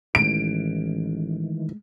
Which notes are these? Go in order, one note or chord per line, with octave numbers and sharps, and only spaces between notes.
A1 D#3 E3 G#3 A3 D7